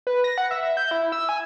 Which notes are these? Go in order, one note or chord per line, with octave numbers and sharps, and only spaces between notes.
B4
A#6
F#5
E5
E5
G6
E4
E6
G#5